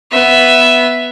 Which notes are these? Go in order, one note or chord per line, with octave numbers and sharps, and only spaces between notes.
B3 E5